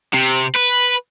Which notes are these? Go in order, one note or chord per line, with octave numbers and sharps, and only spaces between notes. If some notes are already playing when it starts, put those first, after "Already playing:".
C3
B4